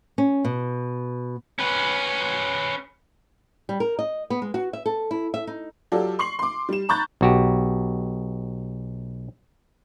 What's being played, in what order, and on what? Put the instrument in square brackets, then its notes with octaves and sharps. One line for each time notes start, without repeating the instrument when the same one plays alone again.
[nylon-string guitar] C#4
B2
[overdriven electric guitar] C#4 B4
[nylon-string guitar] G3
A#4
D#5
B3
G#3
F#4
E5
A4
E4
E5
D#4
[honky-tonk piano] F#3 F4 G4 A4 D5
C6 C#6 C7 F#7
C6 D6
G3 E7
A#5 B5 C#6 F#6 G6 A6
[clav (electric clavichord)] B1 F#4 G4